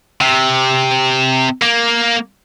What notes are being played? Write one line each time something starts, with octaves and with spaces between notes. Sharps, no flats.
C3
A#3